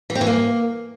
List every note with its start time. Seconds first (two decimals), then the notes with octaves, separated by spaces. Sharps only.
0.10 E3
0.15 C4
0.21 E3
0.27 A#3